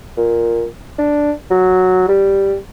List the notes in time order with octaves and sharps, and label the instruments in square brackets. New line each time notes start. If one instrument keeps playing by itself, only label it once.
[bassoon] A#2
D4
F#3
G3